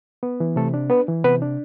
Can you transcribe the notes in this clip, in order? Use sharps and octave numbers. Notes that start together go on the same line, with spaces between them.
B3
E3
C3 A3 A4
D4
B3 B4
E3
C3 B3 B4
D4